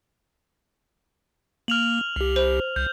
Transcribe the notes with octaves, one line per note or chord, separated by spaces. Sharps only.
A#3 F6 F7 F#7
C2 G4
C5
C2 G6